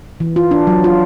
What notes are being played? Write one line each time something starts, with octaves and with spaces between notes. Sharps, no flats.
E3
F4
D4
F#3
F4